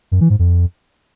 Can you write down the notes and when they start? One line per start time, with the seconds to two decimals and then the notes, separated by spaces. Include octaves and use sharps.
0.12 F#2
0.21 E3
0.30 G#2
0.39 F2